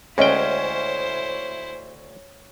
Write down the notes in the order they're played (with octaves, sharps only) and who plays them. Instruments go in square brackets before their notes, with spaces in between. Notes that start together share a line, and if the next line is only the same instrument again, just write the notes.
[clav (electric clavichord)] D2 G5 [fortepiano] G#3 C#4 [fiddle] E4 C5 [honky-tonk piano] C#5